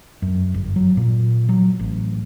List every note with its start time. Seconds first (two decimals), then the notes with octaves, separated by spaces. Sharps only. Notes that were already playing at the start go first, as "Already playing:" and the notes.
0.22 F#2
0.54 G1
0.76 F#3
0.97 A#2
1.49 F#3
1.79 A1